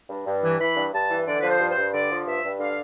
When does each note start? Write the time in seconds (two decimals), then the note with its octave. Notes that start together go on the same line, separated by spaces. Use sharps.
0.10 G2
0.27 G2
0.43 E3
0.59 E3 B5
0.76 G2
0.93 G2 A5
1.10 E3
1.26 D3 D5
1.40 F3 B4
1.49 C5
1.59 G2
1.71 G2 C5
1.93 D3 D5
2.10 F3
2.26 G2 E5
2.44 G2
2.59 D3 F5